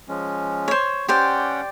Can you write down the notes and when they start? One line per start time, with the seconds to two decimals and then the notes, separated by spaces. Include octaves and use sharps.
0.08 F3 G#3 C#4
0.68 C5 C#5
1.08 C#4 G4 C5 D5 F#5 G5